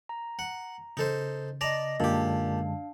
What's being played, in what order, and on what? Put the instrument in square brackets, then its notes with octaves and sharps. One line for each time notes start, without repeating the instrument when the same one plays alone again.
[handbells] A#5
[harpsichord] F#5
[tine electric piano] C#3 [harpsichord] D#4 A4 C5
[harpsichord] D5 A5 A#5 [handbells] D#5 A#6
[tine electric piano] F#2 D3 G#3 [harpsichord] A#2 G4 [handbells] D4 F5 A5